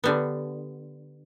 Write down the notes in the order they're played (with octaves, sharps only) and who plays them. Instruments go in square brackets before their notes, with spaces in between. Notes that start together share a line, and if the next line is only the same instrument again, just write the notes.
[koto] D3 G3 B3